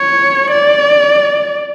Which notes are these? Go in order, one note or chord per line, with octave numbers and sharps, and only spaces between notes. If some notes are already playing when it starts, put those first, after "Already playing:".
Already playing: C#5
D5